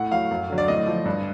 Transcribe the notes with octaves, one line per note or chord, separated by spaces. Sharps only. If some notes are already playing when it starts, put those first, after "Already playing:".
Already playing: A2 F#5
F#3 F5
F#2
D3 F#3
D5
A2 D#5
F3
G2